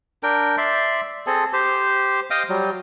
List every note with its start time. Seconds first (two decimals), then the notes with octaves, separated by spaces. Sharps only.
0.23 D4 A#4 G5
0.58 D5 E5 C6
1.26 C4 G#4 A4
1.53 G4 C5
2.30 D#5 F5 G5 D#6
2.49 F#3 G3